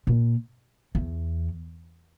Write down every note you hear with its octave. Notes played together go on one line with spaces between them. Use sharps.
A#2
E2